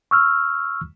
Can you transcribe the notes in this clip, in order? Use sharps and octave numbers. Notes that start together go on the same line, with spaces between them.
C#6 E6 F6